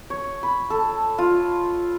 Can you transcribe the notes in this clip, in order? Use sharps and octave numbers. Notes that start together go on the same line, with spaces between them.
C#5
B5
A4
F4